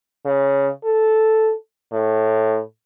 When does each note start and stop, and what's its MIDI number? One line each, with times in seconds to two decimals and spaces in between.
0.26 0.68 49
0.84 1.52 69
1.92 2.59 45